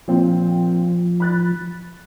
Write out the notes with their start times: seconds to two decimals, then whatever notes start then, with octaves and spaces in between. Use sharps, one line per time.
0.08 A#2 F3 C4
1.20 B5 F#6 A6